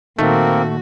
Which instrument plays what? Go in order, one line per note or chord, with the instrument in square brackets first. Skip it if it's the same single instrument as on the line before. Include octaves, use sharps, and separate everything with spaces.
[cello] A#2 F#4 [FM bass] D#3 [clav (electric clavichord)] A3 [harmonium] A#3 C4 A#4